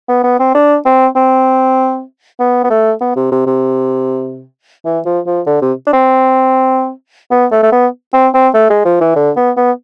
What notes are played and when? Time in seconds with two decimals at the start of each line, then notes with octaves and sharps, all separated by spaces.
0.09 B3
0.24 B3
0.39 C4
0.55 D4
0.85 C4
1.16 C4
2.39 B3
2.64 B3
2.70 A3
3.01 B3
3.16 C3
3.32 C3
3.46 C3
4.85 E3
5.05 F3
5.26 F3
5.47 D3
5.62 C3
5.87 D4
5.93 C4
7.31 B3
7.52 A3
7.63 A3
7.72 B3
8.13 C4
8.34 C4
8.54 A3
8.70 G#3
8.85 F3
9.01 E3
9.16 D3
9.36 B3
9.57 B3